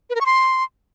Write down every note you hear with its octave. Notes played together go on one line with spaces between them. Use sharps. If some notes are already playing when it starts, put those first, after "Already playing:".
B4
A#4
C#6
C6